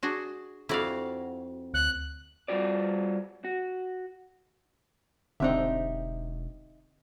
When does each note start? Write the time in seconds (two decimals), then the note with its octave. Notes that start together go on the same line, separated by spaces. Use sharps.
0.03 D4 F#4 G#4
0.69 F2 E4 F#4 D5 F5
1.74 D2 F#6
2.48 G3 F4 F#4 D5
3.44 F#4
5.40 E1 D3 C4 D#4 G4 E5